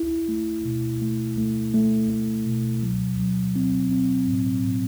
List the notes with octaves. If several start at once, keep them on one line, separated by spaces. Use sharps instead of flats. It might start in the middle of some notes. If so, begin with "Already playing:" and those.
Already playing: E4
A3
B2
A3
A3
A3
A3
B2
F#3
F#3
C4
C4
A2
A2